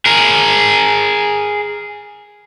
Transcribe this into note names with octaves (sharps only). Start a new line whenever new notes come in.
G#4 A#4